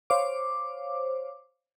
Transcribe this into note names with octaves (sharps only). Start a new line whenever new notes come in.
C5 C#5 F5 D6